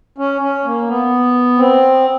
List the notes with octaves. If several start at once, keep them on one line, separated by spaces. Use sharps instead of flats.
C#4
C#4
A#3
B3
C4